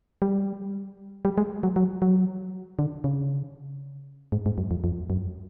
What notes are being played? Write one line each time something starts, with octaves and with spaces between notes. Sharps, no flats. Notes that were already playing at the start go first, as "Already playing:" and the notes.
G3
G3
G#3
F#3
F#3
F#3
D3
C#3
G#2
G#2
F#2
F2
F2
F#2